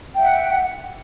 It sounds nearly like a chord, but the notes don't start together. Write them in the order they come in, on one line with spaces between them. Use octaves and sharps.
G5 E5 F#5